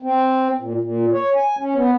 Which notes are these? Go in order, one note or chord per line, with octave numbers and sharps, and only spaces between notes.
C4
A#2
A#2
C#5
G#5
C#4
B3